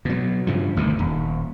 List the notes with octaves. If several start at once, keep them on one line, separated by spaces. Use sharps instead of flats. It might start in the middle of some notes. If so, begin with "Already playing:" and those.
B2 F#3
G2 C#3 F3
G1 D2 C3 D#3
D#1